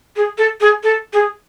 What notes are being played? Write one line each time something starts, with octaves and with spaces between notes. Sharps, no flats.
G#4
A4
G#4
A4
G#4